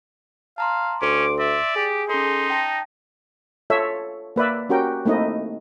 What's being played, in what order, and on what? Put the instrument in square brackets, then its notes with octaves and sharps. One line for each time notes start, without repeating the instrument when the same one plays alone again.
[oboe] F5 [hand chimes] A5 A#5 C6
[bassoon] D2 [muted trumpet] C#4 [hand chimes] C6 [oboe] D6
[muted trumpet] D5 [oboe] E5
[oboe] G4 [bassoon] G#4
[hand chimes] C#4 A4 [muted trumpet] D#4 [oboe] C6
[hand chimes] G5 A5 A#6
[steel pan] F4 A4 C#5 E5
A#3 B4 D5 E5
C#4 F#4 G4 A#4 G5
A3 A#3 C4 D#4 E4 D#5